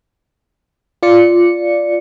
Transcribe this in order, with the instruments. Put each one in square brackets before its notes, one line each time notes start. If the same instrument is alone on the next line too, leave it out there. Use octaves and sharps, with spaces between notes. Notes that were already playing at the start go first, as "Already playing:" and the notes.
[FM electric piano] F4 D5 C#7